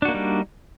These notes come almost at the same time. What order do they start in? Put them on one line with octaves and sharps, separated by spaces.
D4 F#4 A#3 D#4 G3